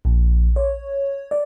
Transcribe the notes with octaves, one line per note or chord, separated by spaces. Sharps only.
A#1
C#5
D5